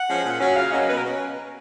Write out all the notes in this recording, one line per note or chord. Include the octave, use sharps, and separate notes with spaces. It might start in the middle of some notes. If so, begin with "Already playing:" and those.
Already playing: F#5
F3 G#3 C#4
A#2
F#3 C#4
C#3 F5
F#3 A#3 C#4 D#5
B2 B4
A#4
C#4